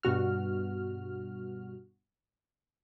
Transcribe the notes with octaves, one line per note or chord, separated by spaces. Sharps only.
G2 B2 F#4 F6